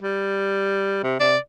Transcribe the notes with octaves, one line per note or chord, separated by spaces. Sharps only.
G3
C3
C3 D5